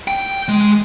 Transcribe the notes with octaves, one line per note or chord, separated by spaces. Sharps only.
G5
G#3